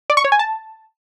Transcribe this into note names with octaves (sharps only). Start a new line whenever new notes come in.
D5
C#6
C#5
G#5
A5